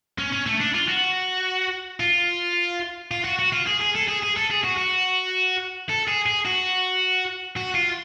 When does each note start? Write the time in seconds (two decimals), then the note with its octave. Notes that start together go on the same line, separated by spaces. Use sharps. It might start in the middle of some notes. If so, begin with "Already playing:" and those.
0.18 C#4
0.32 C#4
0.46 A3
0.60 D4
0.74 F4
0.88 F#4
2.00 F4
3.11 F4
3.24 F#4
3.39 F#4
3.52 F4
3.66 G#4
3.80 G#4
3.95 A4
4.08 G#4
4.23 G#4
4.36 A4
4.51 G#4
4.64 F#4
4.78 F#4
5.90 A4
6.08 G#4
6.26 G#4
6.46 F#4
7.57 F#4
7.75 F4